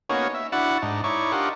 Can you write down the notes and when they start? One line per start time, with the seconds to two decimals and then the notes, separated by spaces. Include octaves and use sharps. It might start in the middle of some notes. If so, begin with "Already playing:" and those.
0.09 A#3 B3 C#4 D#4 F#4 C#5
0.34 E5
0.52 D4 E4 F#4 F#5 A5
0.82 G#2 D4 D#4
1.04 D#4 E4 C#5 D5 C#6
1.32 D4 F4 G4 A#4 D#5 F#5